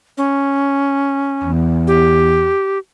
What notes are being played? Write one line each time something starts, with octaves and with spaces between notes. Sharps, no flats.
C#4
E2
G4